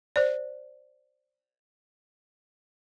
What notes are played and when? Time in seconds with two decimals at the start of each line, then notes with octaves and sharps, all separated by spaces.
0.16 C5 D5